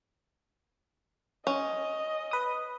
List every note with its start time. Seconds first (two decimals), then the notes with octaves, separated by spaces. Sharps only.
1.47 C#4 D#5
2.31 B4 D#6